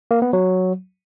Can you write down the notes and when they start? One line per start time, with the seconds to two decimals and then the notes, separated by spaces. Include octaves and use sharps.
0.11 A#3
0.22 B3
0.33 F#3